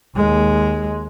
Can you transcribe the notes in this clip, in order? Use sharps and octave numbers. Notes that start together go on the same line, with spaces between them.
D#2 G#3